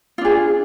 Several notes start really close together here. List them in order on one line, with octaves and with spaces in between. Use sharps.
F4 D4 G#4